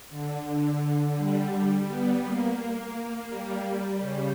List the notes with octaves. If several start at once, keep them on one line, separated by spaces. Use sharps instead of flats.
D3
D3
G3
B3
A#3
G3
C#3